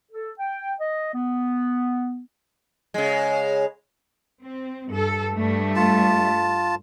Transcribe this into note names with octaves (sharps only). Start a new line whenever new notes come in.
A4
G5
D#5
B3
C#3 G#3
C4
G2 A4
G2 G3 A3
F4 A5